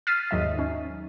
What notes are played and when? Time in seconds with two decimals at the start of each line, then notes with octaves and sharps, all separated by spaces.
0.07 F6 A6 B6 C7 D#7
0.31 D#2 G#2 F#3 D#5 E5
0.59 C#4 D#4